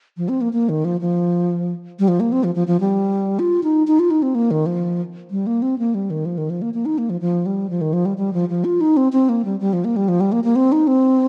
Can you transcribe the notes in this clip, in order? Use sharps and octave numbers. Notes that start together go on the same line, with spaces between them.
F3
C4
A#3
A#3
D#3
F3
F3
G3
F3
A#3
C4
F3
F3
F3
G3
F4
D#4
D#4
F4
D#4
C4
A#3
D#3
F3
G3
A#3
C4
A#3
G3
D#3
F3
D#3
F3
A#3
A#3
D#4
A#3
F3
F3
G3
F3
D#3
F3
G3
G3
F3
F3
F4
D#4
C4
C4
A#3
G3
G3
F3
A#3
G3
F3
G3
A#3
A#3
C4
D#4
C4